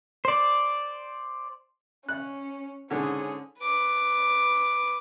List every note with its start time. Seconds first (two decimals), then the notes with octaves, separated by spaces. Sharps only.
0.25 C5 D5
2.09 C#4 F#6
2.90 G#2 D3 C#4 G#4
3.60 B4 D6